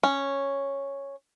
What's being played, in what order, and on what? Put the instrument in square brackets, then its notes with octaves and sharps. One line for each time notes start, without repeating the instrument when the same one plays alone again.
[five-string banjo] C#4